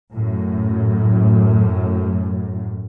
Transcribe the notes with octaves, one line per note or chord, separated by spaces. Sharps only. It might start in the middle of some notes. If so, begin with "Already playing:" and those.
F#2 A2